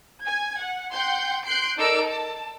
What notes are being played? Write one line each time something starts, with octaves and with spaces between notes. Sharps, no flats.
G#5 G#6
F#5
F#5 G5 C6 G6
C6 F#6 G6 C7 D7
D#4 A4 A#4 D5 E6 D7
A5